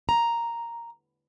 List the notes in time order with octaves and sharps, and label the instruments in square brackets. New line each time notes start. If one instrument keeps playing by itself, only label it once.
[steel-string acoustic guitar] A#5